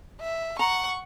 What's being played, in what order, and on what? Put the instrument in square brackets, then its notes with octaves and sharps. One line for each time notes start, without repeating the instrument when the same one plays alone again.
[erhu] E5
[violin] F#5 [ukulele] A#5 [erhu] C#6